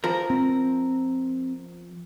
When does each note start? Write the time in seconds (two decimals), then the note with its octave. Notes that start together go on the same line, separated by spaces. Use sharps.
0.04 F3 A#4
0.30 C4